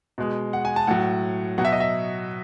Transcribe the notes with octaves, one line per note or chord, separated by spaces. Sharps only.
B2 G#3
F#5
G#5
A5
A2 F#3 F#5
B2 F#3 F#5
E5
D#5
E5